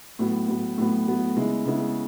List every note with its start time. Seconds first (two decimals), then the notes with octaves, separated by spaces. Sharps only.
0.19 A2 F#3 B3
0.48 A2 F#3 B3
0.78 A2 F#3 B3
1.07 A2 F#3 B3
1.36 C#3 G#3 B3 E4
1.66 C#3 G#3 B3 E4